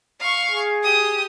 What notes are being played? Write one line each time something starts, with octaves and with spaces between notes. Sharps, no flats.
F5 C#6
G#4
G4 D#6